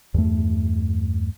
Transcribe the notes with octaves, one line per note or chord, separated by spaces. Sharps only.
E2 G2 A3